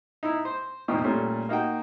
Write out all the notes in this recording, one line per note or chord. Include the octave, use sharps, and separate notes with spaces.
D#4 E4
C5
C2 F2 A#2 C4 D#4 C#6
A#2 G3 A3 C#4
A#3 D#4 F#4 G5